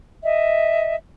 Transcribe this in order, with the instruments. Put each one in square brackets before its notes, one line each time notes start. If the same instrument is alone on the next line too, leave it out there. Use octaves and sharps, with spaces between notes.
[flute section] D#5 E5